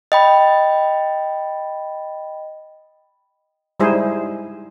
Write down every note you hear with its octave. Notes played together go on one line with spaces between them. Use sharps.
D#5 G5 B5
G3 G#3 D#4 E4 G#4 C5